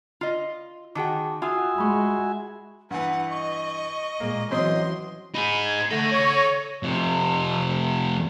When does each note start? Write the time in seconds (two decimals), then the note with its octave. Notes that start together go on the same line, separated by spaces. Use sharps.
0.21 F4 D#5
0.95 D#3 F#4 G#4 G5 A5 D6
1.42 F4 F#4 E5 F#5 G#5 D#6 E6
1.78 G#3 B5 C#6
2.91 G2 E3 B4 F#5
3.30 D#5 C#6
4.20 A#2 G#3 A#3
4.51 E3 F#3 C4 C#4 D#5 C6
5.34 D#4 G#4 B5
5.64 G#6
5.90 A3 A4 F#5 A#6
6.12 C#5
6.83 F2 C3